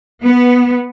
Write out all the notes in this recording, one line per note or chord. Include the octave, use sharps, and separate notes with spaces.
B3